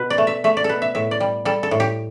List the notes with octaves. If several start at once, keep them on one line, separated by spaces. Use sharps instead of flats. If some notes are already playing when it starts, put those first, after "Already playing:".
Already playing: B2 B4
D5
A3
E5
A3 E5
D5
A4
B2 B4
E5
A2 E5
D5
G3
G3 A4
A4
A2
G4